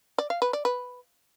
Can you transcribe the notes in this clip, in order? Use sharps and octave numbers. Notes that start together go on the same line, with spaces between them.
D5
F5
B4
D5
B4